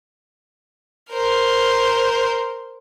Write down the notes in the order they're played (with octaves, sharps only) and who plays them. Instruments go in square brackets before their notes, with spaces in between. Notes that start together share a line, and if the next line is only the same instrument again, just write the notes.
[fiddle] A#4 C5